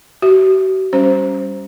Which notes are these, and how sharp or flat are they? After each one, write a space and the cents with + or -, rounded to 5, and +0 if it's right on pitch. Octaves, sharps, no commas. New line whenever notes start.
F#4 +45 E5 -10
G3 +0 C#4 +0 C5 +0